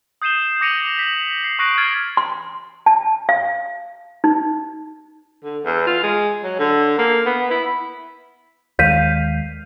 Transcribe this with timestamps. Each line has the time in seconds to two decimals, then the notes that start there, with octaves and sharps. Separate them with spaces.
0.22 D#6 G6 C7 D#7 E7 G7
0.61 D6 A#6 C#7 D#7 F7 F#7
0.99 B6 F#7
1.44 C7
1.59 C#6 D#6 F#6 A#6 C7 D7
1.78 F6 G#6 A6 C7 D7
2.17 C6
2.86 A5
3.29 F5
4.24 D#4
5.44 D3
5.65 E2
5.87 F4
6.03 G#3
6.44 F#3
6.59 D3
6.98 A#3
7.26 B3
7.51 E4
8.79 D#2 D#3 G#3 F5 G6 B6 D#7